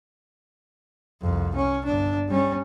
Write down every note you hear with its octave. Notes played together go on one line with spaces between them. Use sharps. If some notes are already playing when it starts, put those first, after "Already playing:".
C2 F2
C#4
G1 D4
G3 C#4